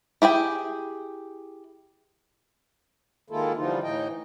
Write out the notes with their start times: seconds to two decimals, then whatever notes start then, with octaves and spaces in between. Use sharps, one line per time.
0.22 E4 G4 G#4 G5
3.30 D#3 G#3 A#3 E4 F4 A4
3.57 D3 E3 F3 G3 D#4 F4
3.83 A2 E3 D#4 D#5 G5